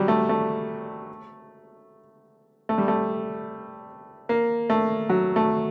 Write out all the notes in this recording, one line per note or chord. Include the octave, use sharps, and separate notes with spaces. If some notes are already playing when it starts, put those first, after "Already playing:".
Already playing: F#3 G3
A3
A3
A3
G3
A3
A#3
A3
F#3
A3